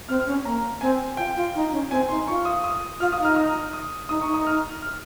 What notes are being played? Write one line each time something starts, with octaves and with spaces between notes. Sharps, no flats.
C4 F6
F6
C#4
A#3 A#5
C4 G#5
F4 G5
F4
D#4
C#4
C4 G#5
D#4 C6
F4 C#6
D#6
D#6
F4 F6
D#6
D#4
F6
D#6
D#6
D#4 D#6
C#6
D#4
D#6
F6
F6